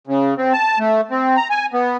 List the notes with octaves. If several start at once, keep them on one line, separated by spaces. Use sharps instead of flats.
C#3
C4
A5
A3
C4
A#5
G#5
B3